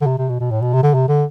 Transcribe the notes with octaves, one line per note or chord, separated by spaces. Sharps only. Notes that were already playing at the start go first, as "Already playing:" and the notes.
D3
C3
C3
B2
B2
A2
B2
C3
D3
C3
D3